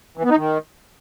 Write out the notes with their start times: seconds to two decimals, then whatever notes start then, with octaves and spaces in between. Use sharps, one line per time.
0.17 E3
0.24 B3
0.31 D#4
0.37 D#3